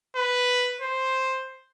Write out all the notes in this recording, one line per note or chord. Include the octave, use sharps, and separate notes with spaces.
B4
C5